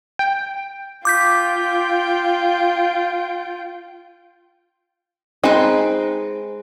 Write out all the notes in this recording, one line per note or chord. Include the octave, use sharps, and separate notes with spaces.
G5
F4 G5 D6 G6 B6
G#3 C4 D#4 B4